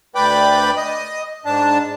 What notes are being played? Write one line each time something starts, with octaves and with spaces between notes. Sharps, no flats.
D2 B4 D5 G5 B5 D6
D#5 D#6
G#2 D4 A5